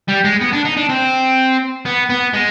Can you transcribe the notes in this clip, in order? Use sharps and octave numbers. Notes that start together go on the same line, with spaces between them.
G3
G#3
B3
D4
D#4
D4
C4
B3
B3
G#3